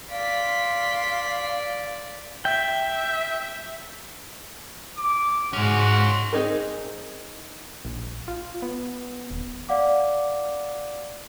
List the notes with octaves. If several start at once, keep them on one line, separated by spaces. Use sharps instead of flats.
D5 F5 C6 B6
E5 G5
D6
G#2 G#3 C#4 F#4
C4 D#4 G#4 A#4
A#1
F4
B3
D#1
D5 F5 F#5 D6